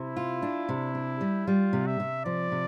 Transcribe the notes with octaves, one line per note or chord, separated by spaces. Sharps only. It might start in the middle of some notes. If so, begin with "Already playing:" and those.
Already playing: C3 E4
F4
D4
C3
D4
G3
G3 F4
C3
E5
C3
F3 D5
C3